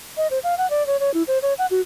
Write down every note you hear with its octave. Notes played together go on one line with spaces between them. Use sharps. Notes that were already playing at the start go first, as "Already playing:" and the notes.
D#5
C5
F5
F#5
D5
C#5
C#5
E4
C5
C#5
F#5
F#4